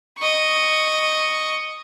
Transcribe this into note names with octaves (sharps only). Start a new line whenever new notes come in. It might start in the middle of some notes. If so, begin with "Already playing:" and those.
D#5 C#6